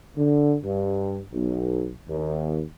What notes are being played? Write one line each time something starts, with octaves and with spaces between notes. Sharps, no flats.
D3
G2
B1
D#2